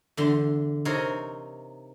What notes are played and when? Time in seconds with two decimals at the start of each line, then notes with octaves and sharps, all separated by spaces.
0.17 E2 D3 C6
0.85 C3 D#4 A#4 C#5 F5